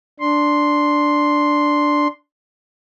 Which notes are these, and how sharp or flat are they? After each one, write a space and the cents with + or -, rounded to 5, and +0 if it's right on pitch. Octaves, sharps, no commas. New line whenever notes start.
D4 +0 C6 +0